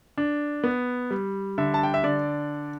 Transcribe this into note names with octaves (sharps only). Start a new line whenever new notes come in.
D4
B3
G3
D3 E5
A5
G5
E5
D3 D5